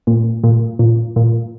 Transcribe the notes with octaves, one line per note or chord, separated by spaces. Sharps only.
A#2
A#2
A#2
A#2